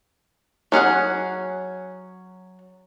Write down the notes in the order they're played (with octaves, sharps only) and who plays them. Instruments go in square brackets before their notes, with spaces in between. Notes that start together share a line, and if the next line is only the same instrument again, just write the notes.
[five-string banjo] F#3 C#4 G#4 F#5